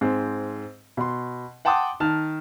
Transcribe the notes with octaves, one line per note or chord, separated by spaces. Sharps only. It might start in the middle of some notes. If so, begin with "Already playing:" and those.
G#2 C4
B2 C6
F#5 G5 A5 C6 D6 D#6
D#3 A5 F6